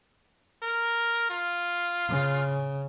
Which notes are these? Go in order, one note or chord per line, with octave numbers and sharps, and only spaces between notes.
A#4
F4
C#3